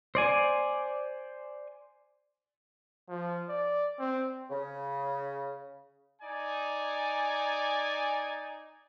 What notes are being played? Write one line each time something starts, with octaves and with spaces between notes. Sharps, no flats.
C5 D5 G#5
F3
D5
C4
C#3
D#4 D5 G#5